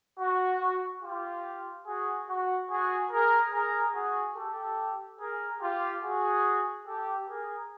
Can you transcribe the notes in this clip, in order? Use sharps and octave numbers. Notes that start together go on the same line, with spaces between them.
F#4
F4 G4
F#4 G#4
F#4
F#4 G#4
G#4 A#4
G#4 A#4
F#4 G#4
G4 A4
G#4 A#4
F4 G4
F#4 G#4
G4 A4
G#4 A#4